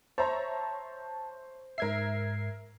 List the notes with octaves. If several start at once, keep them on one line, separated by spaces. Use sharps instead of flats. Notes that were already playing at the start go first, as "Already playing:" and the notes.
C5 C#5 E5 A5 A#5
G#2 A#4 E5 G#6 C7